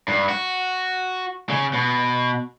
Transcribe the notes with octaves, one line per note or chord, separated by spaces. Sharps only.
G2
F#4
C#3
B2